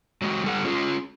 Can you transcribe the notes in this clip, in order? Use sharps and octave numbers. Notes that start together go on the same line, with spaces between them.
F#3 G#3 F#4
G3 A4 F#5
C#4 F4 G#4